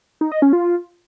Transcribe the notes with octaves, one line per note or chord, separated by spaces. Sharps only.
D#4
D#5
C#4
F4